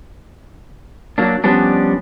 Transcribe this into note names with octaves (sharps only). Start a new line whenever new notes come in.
F#3 A#3 D4
F3 G3 B3 C#4 D4